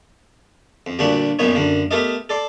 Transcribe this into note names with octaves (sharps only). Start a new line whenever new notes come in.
F2
D2 G2 A#2 D4 F#4 F#5
B1 F#2 A#2 B3 D#4 C#5
F#2 D3 A#3
A3 B3 G4 A4 A#4 D#5
A4 D5 C6